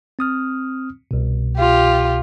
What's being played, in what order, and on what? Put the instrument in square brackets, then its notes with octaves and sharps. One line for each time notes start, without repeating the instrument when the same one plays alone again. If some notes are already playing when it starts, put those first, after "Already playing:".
[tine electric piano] C4 D#6 F6
C2 B2
[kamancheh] F4 G4